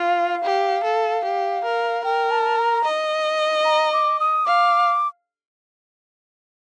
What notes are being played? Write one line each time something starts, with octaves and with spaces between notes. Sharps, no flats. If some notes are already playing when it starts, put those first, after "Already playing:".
Already playing: F4 F5
G4
A4
G4
A#4
A#4 G5
A5
A#5
D#5
A#5
D6
D#6
F5 D6